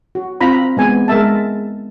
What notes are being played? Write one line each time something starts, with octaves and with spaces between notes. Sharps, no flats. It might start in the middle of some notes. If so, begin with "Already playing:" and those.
F#4
C4 F4 A#5 B5
G#3 B3 G#5
G#3 A#4 E5 A5